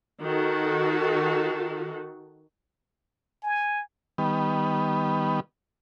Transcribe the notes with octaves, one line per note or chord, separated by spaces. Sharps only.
D#3 F#4 A4
G#5
D#3 G3 B3